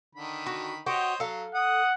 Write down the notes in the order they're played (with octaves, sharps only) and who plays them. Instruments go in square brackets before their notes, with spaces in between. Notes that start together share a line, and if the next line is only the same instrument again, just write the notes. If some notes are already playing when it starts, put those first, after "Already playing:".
[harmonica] D3 D#3 B5
[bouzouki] F#4
[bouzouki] F#4 G4 F#5 [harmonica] C5 C#5 D#5
[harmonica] F#3 [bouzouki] A4 F5
[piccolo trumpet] F#5 [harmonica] D#6